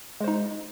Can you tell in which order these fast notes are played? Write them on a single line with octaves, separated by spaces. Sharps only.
G#3 C5 D#4